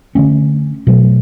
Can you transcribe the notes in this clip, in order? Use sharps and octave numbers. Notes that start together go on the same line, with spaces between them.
D3 A3 C#4
B2 F#3 A3